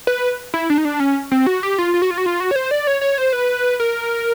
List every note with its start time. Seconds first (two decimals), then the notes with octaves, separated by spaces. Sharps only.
0.07 B4
0.54 E4
0.70 D4
0.78 D#4
0.85 D4
1.00 C#4
1.31 C4
1.47 F#4
1.63 G4
1.78 F4
1.94 F4
2.02 F#4
2.11 F4
2.18 F#4
2.26 F4
2.40 F#4
2.51 C#5
2.56 C5
2.71 D5
2.87 C#5
3.02 C#5
3.18 C5
3.33 B4
3.80 A#4